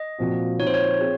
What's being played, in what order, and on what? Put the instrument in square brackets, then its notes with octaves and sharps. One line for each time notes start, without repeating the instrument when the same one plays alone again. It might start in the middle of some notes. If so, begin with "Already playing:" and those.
Already playing: [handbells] D#5
[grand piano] A#2 F3 C4 F#4
[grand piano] F3 C4 D#4 [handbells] C#5
[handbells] C5
C#5
[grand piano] C4 F4 G#4